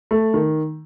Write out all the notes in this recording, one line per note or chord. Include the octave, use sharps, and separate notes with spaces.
A3
D#3